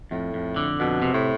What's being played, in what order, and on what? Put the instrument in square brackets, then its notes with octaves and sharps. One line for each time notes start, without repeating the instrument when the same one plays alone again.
[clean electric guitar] F2 [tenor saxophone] A2
[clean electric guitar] F2
D3
[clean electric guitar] F2 [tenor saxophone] B2
[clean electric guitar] C3
[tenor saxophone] A2